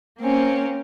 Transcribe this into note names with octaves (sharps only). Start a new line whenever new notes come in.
A#3 C4 C#4